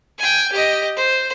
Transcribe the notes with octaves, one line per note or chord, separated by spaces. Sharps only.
G5 G#5
G4 D#5
C5